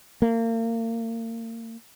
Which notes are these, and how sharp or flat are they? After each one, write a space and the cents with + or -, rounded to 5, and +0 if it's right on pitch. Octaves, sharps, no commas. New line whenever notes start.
A#3 -35